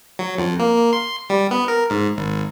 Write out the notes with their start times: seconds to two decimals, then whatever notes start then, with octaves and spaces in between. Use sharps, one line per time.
0.19 F#3
0.38 F2
0.59 A#3
0.78 A#3
0.93 C6
1.30 G3
1.51 B3
1.68 A#4
1.90 G#2
2.16 G#1